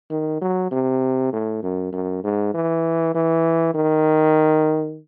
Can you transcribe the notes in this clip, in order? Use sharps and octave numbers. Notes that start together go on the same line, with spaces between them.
D#3
F#3
C3
A2
F#2
F#2
G#2
E3
E3
D#3